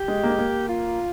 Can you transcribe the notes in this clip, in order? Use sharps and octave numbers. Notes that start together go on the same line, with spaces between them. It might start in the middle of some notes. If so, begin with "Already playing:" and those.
Already playing: G4
G#3
A#3
G#3
A#3
F4